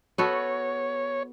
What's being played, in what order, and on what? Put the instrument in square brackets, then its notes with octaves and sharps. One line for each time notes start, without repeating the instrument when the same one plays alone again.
[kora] B3 F#4 A4 [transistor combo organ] C#5